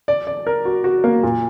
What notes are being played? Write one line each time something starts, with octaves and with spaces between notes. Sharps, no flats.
D5
D5
A#4
F#4
F#4
A#3
A#2